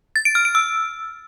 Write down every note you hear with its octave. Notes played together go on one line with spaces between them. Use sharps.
A6
D7
F6
D7
E6